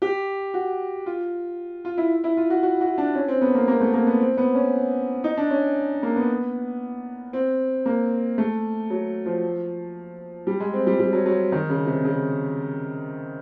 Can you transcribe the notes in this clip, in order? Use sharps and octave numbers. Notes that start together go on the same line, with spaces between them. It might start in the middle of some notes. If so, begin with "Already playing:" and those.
G4
F#4
F4
F4
E4
E4
F4
F#4
F#4
F#4
D4
C#4
C4
B3
A#3
A#3
A3
A#3
B3
C4
B3
C#4
D#4
D4
C#4
A#3
B3
C4
A#3
A3
F#3
F3
G3
G#3
C4
G3
G3
F#3
F#3
D#3
C#3
C3
C#3